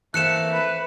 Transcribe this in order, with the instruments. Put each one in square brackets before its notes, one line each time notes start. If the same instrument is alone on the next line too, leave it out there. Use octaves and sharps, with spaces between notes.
[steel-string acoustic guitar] E3 A#3 [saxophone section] A3 C4 [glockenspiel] F#6 C#7 E7
[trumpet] B4